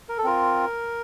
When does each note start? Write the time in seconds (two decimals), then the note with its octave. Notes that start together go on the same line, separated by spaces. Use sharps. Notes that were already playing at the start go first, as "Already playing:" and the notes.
0.09 A#4
0.18 A4
0.24 C4 F4 A#4